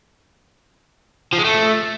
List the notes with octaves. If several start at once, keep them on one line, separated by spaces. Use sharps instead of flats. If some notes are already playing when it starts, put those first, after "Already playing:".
F3
G#3
A3